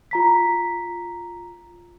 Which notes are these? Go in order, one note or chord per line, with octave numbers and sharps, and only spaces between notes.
F4 A#5 B6